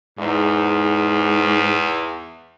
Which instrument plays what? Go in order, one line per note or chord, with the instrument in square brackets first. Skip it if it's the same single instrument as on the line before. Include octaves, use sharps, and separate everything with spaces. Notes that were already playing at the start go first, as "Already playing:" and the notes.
[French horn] E2 [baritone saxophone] G#2